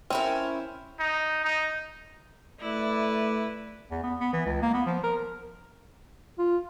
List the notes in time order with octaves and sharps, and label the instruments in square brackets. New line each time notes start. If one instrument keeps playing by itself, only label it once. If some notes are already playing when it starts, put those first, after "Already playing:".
[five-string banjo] C4 [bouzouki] C#4 E4 A#4
[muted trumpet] D#4
D#4
[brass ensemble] A3 D5 [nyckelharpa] E4 B4
[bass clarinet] E2
B3
B3
E3
C#2
A#3
B3
F3
A#4
F4